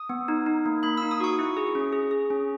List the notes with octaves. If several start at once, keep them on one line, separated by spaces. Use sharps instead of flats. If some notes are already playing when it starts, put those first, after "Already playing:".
Already playing: D#6
B3
D#4
D#4
A#3
A#3 B5
D#4 E6
D#6
F#4 C#6
E4
G#4
C#4
G#4
G#4
C#4